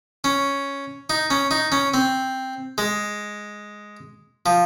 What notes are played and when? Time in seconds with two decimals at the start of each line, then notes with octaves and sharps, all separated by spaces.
0.24 C#4
1.10 D#4
1.30 C#4
1.51 D#4
1.72 C#4
1.94 C4
2.78 G#3
4.46 F3